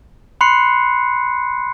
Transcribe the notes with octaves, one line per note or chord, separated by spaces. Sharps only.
B5 C6 F#6 C7 C#7